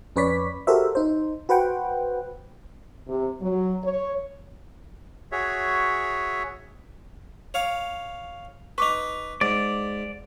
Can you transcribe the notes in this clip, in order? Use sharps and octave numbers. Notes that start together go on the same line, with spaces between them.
F2 C#4 B4 C#5 D5 B6
F#4 G4 A4 A#4 C5 E5
D#4 C5
F#4 B4 C5 F#5 G5
C3
F#3
C#5
F#4 G#4 C#5 E5
C#5 F5 D6
D#4 B4 C#6 D6
G#2 D5